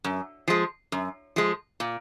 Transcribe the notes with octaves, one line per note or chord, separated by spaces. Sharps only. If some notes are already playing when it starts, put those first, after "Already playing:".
F#2
F3 G#3
F#2
F3 G#3
A#2